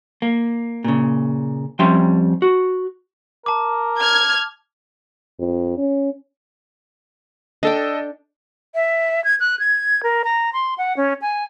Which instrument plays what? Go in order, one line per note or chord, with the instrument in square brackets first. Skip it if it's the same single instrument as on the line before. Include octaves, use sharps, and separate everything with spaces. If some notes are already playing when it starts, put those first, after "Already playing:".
[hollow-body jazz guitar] A#3
A#2 C#3
F2 G3 C#4 E5 G5 C6
F#4
[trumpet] A#4 [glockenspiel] A5 D6
[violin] F6 [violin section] G#6
[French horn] F2
C#4
[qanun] D4 G5 [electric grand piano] A4 D#5
[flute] E5
G#6
F#6
G#6
A#4
A#5
C6
F#5
C#4
G#5